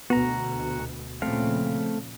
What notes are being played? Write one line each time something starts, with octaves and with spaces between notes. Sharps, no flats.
D2 B2 B3 F#4 A#5
A#2 C#3 F3 A3 C4 F5